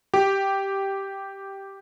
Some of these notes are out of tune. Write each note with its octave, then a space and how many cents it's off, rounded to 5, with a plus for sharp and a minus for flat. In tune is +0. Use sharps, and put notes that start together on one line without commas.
G4 -5